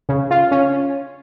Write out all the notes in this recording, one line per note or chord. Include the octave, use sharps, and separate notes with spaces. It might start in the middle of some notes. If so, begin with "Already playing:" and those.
C#3
F4
C#4